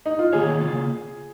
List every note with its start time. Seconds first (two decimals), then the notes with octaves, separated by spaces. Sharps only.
0.06 D#4
0.19 F4
0.33 D#3 A#3 F4 G#4 C#5
0.61 C#3 A#3 F4